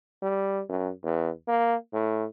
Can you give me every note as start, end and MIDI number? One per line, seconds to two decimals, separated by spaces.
0.23 0.62 55
0.69 0.91 42
1.03 1.30 40
1.48 1.75 58
1.93 2.25 45